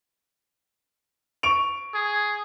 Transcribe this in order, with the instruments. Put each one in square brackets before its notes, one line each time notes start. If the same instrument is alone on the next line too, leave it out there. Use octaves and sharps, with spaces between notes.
[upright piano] C#6 D7 F7
[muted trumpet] G#4